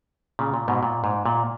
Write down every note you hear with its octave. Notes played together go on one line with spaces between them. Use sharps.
A#2 C#3
A#2
G#2 B2
A#2
G#2
A#2